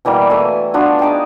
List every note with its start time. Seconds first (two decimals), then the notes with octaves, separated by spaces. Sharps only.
0.05 B2 E3 G3 A#3
0.30 E3 A3 E5 G#5
0.74 B3 D4 F4 F#4
0.99 D#4 G#4 G5 A5